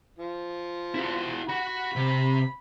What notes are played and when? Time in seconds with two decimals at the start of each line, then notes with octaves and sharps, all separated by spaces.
0.19 F3
0.94 E4 F#4
1.49 F#4 F#5 B5
1.96 C3